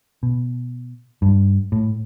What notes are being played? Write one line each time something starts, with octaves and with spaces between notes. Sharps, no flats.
B2
G2
A2